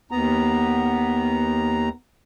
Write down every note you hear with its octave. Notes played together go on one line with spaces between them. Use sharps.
D#2 B3 A#5